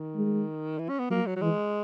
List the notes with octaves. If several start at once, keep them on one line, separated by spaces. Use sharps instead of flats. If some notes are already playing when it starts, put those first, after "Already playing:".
Already playing: D#3
G#3
E3
C#4
B3
F#3 A#3
F#3
F#3
E3 G#3